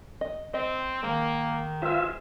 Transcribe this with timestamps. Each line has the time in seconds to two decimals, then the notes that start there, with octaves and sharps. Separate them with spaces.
0.21 D#5
0.54 C4 D#5
1.03 D#3 G#3 A#3
1.82 G#3 F4 B4 C5 E5